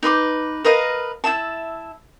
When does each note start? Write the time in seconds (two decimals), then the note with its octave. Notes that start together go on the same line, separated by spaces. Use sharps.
0.03 D#4 B4 C6 D6
0.65 A#4 B4 D#5 F5
1.24 E4 F4 E5 A5